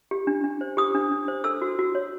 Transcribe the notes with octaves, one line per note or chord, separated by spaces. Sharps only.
G4
D4
D4
C5
G4 D#6
D4
D4
C5
A4 E6
F#4
F#4
C#5